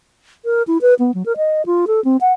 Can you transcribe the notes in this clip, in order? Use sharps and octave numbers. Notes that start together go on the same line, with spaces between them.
A#4
E4
B4
B3
F#3
A#4
D#5
F4
A4
C4
F#5